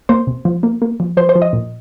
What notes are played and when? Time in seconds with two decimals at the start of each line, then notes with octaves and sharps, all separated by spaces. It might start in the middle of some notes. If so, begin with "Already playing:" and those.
0.09 A#3 C5
0.27 C3
0.45 F3
0.63 A#3
0.82 A#3
1.00 F3
1.17 F3 C5
1.29 C5
1.35 F3
1.42 D#5
1.53 A#2